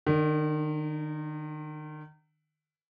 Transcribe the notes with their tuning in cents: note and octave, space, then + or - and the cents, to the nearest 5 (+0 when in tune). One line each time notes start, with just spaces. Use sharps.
D#3 -30 D4 +0